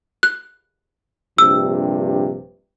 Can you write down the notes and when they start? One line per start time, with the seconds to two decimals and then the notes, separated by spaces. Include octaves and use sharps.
0.23 F#6
1.38 A#1 G2 C3 E6